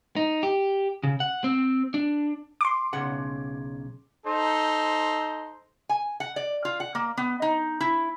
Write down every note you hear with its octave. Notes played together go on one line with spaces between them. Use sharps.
D#4
G4
C#3
F#5
C4
D4
C6 D6
B1 C#3 F#5
D#4 A4 C5
G#5
F#5
D5
F4
F#5
A#3
B3
D#4
E4